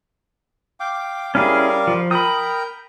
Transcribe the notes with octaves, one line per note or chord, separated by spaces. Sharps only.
F5 G5 D6
G3 C#4 E4 G#4 A#4 F5
F3
A#4 G5 A#5 B5 D#6